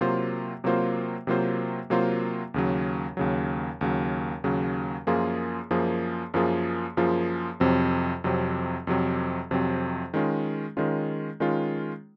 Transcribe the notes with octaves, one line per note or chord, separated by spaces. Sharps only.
C3 F#3 A#3 F4 C5
C3 F#3 A#3 F4 C5
C3 F#3 A#3 F4 C5
C3 F#3 A#3 F4 C5
D#2 C#3 F#3
D#2 C#3 F#3
D#2 C#3 F#3
D#2 C#3 F#3
F#2 F3 A#3 F4 G#4
F#2 F3 A#3 F4 G#4
F#2 F3 A#3 F4 G#4
F#2 F3 A#3 F4 G#4
F2 C3 F#3 C4
F2 C3 F#3 C4
F2 C3 F#3 C4
F2 C3 F#3 C4
D#3 G#3 C#4 F4
D#3 G#3 C#4 F4
D#3 G#3 C#4 F4